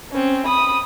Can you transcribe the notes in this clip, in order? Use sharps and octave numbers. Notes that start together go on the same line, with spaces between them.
C4 C#4
B5 D#6